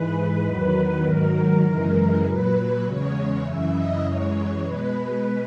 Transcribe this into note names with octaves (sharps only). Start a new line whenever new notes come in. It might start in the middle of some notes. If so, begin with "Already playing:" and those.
Already playing: G#2 E3 G#3 B4
E2 D#3 F#3
G#2 D#3 F#3 A#4
F#2 C#3 E3 G#3 A#4
A#2 F#3 B4
E2 C#3 G#3 C#5
F#2 C#3 E3 E5
D#5
F#2 E3 G#3 C#5
B2 G#3 B4